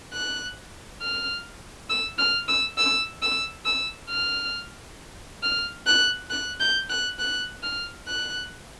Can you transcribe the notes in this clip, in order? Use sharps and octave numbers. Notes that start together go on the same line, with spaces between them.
F#6
F6
E6
F6
E6
E6
E6
E6
F6
F6
F#6
F#6
G6
F#6
F#6
F6
F#6